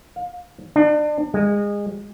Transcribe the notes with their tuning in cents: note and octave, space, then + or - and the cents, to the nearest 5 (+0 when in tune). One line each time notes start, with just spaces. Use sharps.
F5 +30
D4 +35
G#3 -25